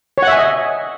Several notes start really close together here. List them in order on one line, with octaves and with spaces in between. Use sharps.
C#5 F#5 E5 G#5 D#5